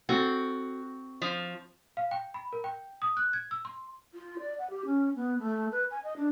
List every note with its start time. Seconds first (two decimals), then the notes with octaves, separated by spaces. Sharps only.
0.09 C4 F#4 A4
1.22 F3
1.97 F5
2.11 G5
2.34 B5
2.53 A#4
2.64 G5
3.02 D#6
3.17 F#6
3.33 G#6
3.51 E6
3.65 C6
4.14 F4
4.39 D5
4.59 F#5
4.70 G4
4.86 C#4
5.15 B3
5.39 A3
5.72 B4
5.91 G#5
6.04 D#5
6.17 D4